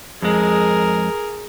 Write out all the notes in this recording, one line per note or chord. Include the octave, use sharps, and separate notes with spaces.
F2 G#3 G#4 A#4